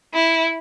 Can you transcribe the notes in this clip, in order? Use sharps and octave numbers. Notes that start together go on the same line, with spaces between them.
E4